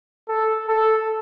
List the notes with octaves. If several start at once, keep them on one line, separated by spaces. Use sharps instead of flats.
A4
A4